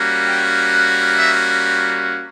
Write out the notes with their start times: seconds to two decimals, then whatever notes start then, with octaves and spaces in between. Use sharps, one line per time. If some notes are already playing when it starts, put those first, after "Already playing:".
Already playing: G3 A#3 C#4 F#4
0.27 G5
0.72 F#5
1.16 E5